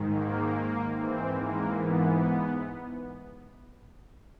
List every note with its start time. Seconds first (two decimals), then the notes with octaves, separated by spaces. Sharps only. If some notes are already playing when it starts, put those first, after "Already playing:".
Already playing: G#2 D#3
0.10 A#3
0.92 G#2 E3 C4
1.34 A#3
1.75 B3